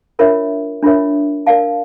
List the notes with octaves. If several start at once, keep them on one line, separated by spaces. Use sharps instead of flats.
D4 F4 A#4 C#5 E5
D4 F4 A#4 C#5 E5
A#4 D5 F5 A5